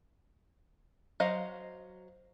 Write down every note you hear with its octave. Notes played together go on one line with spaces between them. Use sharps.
F#3 C5 D#5 F5